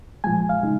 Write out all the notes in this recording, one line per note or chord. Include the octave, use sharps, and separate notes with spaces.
A#2 F3 G#3 G#5
F5
C#3 G#3 D#4